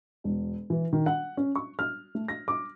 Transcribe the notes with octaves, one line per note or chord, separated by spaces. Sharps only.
E1
E3
D#3
F#5
C#4
C#6
F6
A3
A#6
D6